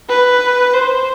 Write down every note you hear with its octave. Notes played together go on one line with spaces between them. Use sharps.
B4
C5